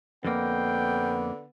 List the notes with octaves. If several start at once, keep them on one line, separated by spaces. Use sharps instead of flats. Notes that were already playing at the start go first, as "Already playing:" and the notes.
F2 D3 A#3 B3 G5